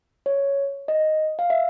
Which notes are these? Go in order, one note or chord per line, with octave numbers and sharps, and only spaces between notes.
C#5
D#5
F5
E5